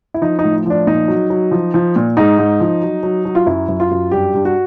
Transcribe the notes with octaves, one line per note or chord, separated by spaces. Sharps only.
E4
F3 D#4
D#4
A2
F3 D4
A#2 D#4
F#3
F#3
F3
F3
A#2
G#2 D#4
G#2
F3
F#3
F#3
F#3
F4
F#2 E4
F#2
F4
F#2
G2 G4
G2
F#4